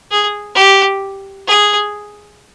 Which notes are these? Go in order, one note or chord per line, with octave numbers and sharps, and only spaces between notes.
G#4
G4
G#4